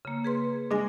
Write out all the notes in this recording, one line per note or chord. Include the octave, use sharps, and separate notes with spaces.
C#3 A#3
G#4 B4 C6
G#3 D4 G#5 A#6